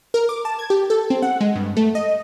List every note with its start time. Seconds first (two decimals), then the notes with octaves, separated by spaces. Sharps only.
0.14 A#4
0.29 D6
0.45 A5
0.59 G#6
0.70 G4
0.90 A4
1.10 C4
1.22 F#5
1.41 G#3
1.56 G2
1.77 A3
1.95 D#5